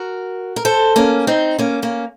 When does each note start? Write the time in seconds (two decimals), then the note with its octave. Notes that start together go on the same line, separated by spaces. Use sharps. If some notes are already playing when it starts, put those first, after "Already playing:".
Already playing: F#4 A#4
0.56 A#4
0.65 A4 C5
0.96 A#3 C#4
1.27 C4 D#4
1.58 A#3 C#4
1.82 A#3 C#4